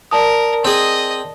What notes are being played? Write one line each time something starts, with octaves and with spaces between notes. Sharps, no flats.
A#4 D5 A5 D#6
C4 G#4 D#5